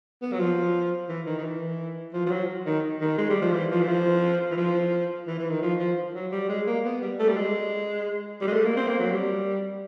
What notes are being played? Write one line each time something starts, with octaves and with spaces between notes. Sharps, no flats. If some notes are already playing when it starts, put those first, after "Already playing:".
B3
F#3
F3
E3
D#3
D#3
E3
F3
F3
F#3
D#3
D#3
G#3
G3
F3
E3
F3
E3
F3
E3
F3
E3
E3
D#3
F3
F3
F#3
G3
G#3
A#3
B3
G3
A3
G3
G#3
G3
G#3
A3
A#3
C4
A#3
F#3
G3